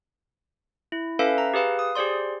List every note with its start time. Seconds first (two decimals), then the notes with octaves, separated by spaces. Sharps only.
0.92 E4
1.19 C#4 A4 B4 E5 F5
1.38 A#5
1.54 G4 G#4 B4 F5
1.79 D#6
1.95 G4 G#4 C5 D5 C6